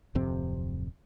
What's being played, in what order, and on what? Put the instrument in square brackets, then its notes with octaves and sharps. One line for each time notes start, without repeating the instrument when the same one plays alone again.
[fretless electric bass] D1 F2 C3 C4